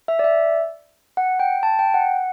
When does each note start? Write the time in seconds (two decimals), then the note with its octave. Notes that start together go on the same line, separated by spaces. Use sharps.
0.08 E5
0.19 D5
0.24 E5
1.17 F#5
1.40 G5
1.63 A5
1.79 G5
1.94 F#5